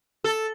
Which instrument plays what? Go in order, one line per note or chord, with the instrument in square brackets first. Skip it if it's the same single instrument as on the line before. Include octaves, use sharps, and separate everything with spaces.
[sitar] A4